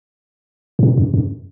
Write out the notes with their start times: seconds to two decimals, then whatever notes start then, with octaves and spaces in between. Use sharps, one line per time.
0.79 G#2
0.83 A#2
0.97 F#2
1.14 F#2